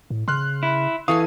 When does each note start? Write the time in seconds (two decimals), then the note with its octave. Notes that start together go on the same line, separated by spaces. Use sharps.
0.10 A2
0.28 C#3 C6 F6 F#6
0.63 E4
1.08 E3 A4 F5 G#5 C#6 D#6